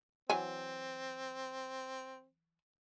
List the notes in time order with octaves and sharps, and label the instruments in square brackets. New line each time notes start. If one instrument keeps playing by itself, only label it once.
[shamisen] E3 F#3 G#5 [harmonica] C4